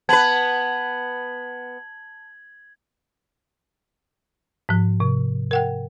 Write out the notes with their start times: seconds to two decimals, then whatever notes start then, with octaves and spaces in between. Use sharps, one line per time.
0.09 B3 B4 A5 G#6 F#7
4.69 G#2 F3
5.00 C3
5.51 A#4 F#5 G5